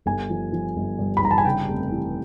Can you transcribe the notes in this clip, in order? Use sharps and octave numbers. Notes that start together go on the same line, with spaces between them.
G1 G#5
F3
F3
G1
G2
B5
G1 A#5
A5
G#5
C#3 G5
F1
E3